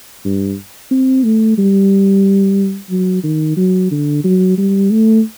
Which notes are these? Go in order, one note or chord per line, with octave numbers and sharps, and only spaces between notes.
G2
C4
A3
G3
F#3
D#3
F#3
D3
F#3
G3
A3